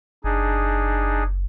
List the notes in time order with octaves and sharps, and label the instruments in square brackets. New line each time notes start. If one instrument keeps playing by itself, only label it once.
[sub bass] F#1 [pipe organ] D4 D#4 G#4